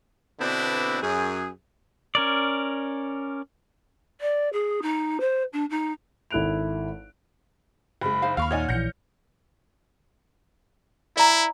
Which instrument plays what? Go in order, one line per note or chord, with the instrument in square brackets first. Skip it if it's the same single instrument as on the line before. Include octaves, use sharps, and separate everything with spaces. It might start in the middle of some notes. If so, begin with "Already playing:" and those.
[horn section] B2 D3 B3 C4 D4 E4
F#2 G#4
[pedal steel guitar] C#4 A#4 D5
[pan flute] D5
G#4
D#4
C5
D4
D#4
[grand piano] G#1 E4 A4 F#6 D7 F7
[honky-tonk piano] F#1 G#3 [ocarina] B5
[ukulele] D#4 C5 F5
[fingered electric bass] D#2 [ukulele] F5 [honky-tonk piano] B5 C#6 F6
[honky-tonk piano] A#2 D#4 G#5 [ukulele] C#5 D5 [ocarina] F#5
[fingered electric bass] A#1 C#3 E3 [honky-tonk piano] G6 A#6 C#7
[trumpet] E4 [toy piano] D5 A#5